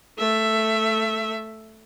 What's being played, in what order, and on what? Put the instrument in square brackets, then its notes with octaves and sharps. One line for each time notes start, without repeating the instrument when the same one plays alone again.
[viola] A3 E5